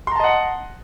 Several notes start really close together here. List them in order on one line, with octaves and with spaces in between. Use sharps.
C6 A#5 A5 D#5 F#5